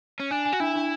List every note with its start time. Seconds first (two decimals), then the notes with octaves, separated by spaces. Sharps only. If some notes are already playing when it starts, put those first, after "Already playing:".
0.20 C#4
0.31 D4 G#5
0.46 G#5
0.53 F#4
0.60 D4 E4
0.75 D4